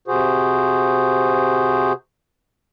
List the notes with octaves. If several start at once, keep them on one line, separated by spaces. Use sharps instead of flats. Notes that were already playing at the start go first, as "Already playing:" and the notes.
C3 F#4 G#4 C5